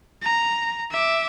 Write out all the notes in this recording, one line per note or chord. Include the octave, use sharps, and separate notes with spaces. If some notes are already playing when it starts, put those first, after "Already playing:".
A#5
E5 D6